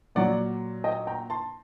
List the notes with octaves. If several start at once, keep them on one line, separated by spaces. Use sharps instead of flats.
A#2 F#3 D5 F#5
D#5 G5
G5 A#5
A5 C6